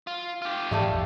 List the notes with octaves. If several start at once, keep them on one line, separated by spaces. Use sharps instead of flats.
F4
F4 G4
G#2 E3 F3 G3 A3 A4
A1 E2